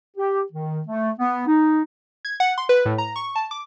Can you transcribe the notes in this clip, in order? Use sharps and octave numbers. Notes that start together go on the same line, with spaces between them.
G4
D#3
A3
B3
D#4
G#6
F#5
C6
B4
A2
A#5
C#6
A5
D6